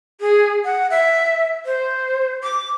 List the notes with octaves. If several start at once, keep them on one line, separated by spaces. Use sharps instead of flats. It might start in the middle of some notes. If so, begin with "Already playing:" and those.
G#4
F#5
E5
C5
D6